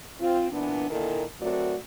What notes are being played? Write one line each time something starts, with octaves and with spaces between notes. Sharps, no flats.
C4 F4
A#2 E3 B3 D4
A#2 D3 D#3 A#3 E4 A4
F#3 A3 C4 F#4 A#4 D5